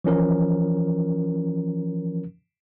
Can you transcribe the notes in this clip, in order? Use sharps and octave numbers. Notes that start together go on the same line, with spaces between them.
E3 F3 C#4 A#4